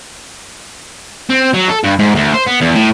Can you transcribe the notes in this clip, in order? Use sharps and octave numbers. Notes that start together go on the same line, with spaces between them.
C4
F#3
A4
G2
G#2
D2
C5
B3
E2
A2